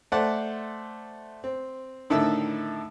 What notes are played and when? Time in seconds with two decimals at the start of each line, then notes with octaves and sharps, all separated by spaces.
0.12 A3 A4 C5 D5 F#5
1.44 C4
2.10 A2 D3 D#3 A4 E5 E6